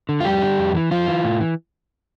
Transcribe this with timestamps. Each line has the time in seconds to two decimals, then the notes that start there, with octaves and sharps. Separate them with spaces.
0.09 D3
0.20 F4
0.25 F2 G3 G4
0.42 D3
0.59 F2
0.75 E3
0.91 F2 F3 F4
1.08 E3
1.24 A2
1.41 E3